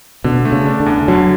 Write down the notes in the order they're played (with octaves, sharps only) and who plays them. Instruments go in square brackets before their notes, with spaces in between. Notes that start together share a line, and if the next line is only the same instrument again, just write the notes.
[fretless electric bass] B2 [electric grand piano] D3
[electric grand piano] A3
[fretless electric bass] C#3
[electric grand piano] D4
[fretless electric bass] D3
[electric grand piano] E2
[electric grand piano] D3 [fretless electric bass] F#3